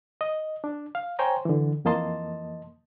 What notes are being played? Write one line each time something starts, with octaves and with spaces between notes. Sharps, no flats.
D#5
D4
F5
C5 C#5 G5 G#5 A#5
D3 E3
F2 E3 A#3 D#5 A5 C6